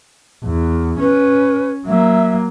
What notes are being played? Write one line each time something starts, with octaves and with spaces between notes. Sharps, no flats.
E2
C#4 B4
F#3 A#3 E5